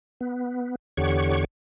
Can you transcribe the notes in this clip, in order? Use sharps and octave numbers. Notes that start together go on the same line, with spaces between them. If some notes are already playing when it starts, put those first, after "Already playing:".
B3
E2 D3 G4 C#5 F#5 C#6